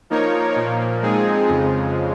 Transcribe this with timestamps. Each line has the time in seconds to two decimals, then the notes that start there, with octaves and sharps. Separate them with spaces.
0.10 F3 A#3 D#4 A#4 C#5
0.56 A#2 F3 A#3
1.02 F3 G#3 C4 D#4 G#4
1.49 F2 C#3 F3 G#3